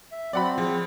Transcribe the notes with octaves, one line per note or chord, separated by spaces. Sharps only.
E5
F#3 C4 D5 F#5 B5
F3 G#4